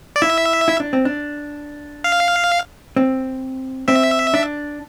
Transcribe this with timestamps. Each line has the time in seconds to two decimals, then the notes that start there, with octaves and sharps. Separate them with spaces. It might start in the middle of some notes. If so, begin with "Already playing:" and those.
0.16 D5
0.22 E4 E5
0.68 E4
0.80 D4
0.93 C4
1.05 D4
2.04 F5
2.97 C4
3.88 C4 E5
4.34 D4